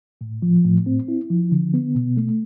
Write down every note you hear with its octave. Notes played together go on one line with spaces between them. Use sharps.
A2
F3
A2
C4
E4
F3
D3
B3
B2
A3